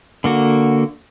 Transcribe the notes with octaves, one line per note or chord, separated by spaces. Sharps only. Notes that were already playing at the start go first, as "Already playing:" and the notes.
D3 A#3 F#4